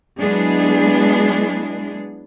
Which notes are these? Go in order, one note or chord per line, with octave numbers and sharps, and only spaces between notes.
F#3 G#3 B3 D4 E4 G#4